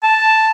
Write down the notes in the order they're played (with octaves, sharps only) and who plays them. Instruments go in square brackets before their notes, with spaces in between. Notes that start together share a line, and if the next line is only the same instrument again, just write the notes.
[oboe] A5